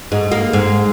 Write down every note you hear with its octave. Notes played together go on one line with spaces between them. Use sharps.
G#2
A#3
G#2